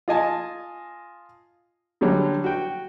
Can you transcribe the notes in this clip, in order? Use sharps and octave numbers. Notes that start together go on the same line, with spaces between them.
F4 D#5 G#5 A5
D3 F#3 G3 C#5
F#4 G5